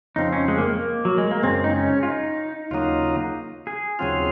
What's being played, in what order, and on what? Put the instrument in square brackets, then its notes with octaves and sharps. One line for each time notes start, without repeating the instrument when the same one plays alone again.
[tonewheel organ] F2 C#3 F3 C4 [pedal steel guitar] D#4
[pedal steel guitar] C#4
G#3
A#3
A#3
F#3
G#3
A#3
[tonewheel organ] F#2 C#3 G#3 [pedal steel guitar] C4
[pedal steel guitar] D#4
C#4
F4
D#4
[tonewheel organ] D#2 C#3 F#3 A#3 D#4 [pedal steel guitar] F4
[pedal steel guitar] G#4
[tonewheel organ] D#2 C#3 F#3 C4 F4